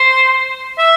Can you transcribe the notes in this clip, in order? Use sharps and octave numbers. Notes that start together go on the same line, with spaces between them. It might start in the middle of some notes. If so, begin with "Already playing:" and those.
Already playing: C5
E5